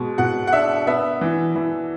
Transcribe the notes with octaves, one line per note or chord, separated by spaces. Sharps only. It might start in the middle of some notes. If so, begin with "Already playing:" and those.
Already playing: B2 G#3
B2 F#5
F#5
D4 E5
B3 E5
E3
E3